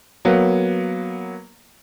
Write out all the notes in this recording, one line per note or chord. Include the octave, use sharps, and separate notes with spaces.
F#3 A#3 B3